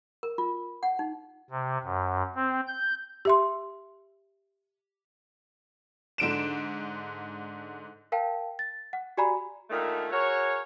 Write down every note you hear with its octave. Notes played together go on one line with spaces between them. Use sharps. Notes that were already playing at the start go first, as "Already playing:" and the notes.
A#4
F4
F#5
D#4
C3
F#2
C4
G6
G4 E5 C6
G#2 D3 D7 E7
A#4 F5 G5 A5
A6
F#5
F#4 G4 D5 G#5 A#5 B5
A#2 D3 D#3 A3
F#4 G#4 A#4 C#5